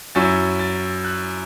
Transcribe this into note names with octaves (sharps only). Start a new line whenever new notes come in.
F#2 F#3 C#4 E4 A6
A6
F#6